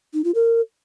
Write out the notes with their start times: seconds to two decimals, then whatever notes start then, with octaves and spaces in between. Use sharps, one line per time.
0.14 D#4
0.24 F4
0.35 A#4